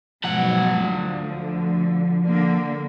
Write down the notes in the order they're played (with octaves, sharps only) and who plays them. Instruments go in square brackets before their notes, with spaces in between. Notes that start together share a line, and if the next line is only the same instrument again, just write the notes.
[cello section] G#2 B2 F#3 [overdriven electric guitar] F3 F#5
[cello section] D2 D3
D3 A#3